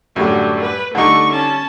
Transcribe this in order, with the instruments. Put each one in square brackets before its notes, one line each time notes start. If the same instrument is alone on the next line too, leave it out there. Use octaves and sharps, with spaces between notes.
[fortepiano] F#2 A2 G3 [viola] D3
[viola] B4
[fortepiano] D3 G3 D#4 [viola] A3 C#6
[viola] C#4 A5